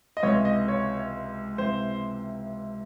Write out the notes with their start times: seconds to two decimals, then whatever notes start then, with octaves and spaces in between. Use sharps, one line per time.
0.17 D#5
0.23 C#2 C3 E3 C#5
0.45 D#5
0.68 C#5
1.58 C#2 C3 E3 C5